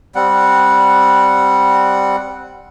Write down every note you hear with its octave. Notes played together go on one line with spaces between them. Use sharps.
G3 C4 F#5